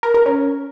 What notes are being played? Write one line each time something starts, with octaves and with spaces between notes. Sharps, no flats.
A#4
A#4
C#4